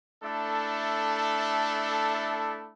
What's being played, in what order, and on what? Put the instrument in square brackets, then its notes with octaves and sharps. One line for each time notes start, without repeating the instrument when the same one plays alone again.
[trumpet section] A3 D4 E4 A4